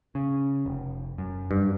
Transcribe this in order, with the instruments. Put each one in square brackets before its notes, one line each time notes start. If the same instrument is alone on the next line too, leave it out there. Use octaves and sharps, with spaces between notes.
[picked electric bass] C#3
F1
F#2
[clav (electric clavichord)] G2